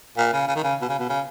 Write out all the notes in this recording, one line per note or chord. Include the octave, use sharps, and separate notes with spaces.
A#2
C#3
C#3
D#3
C#3
B2
C#3
B2
C#3